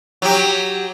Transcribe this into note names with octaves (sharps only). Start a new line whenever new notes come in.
F#3 G4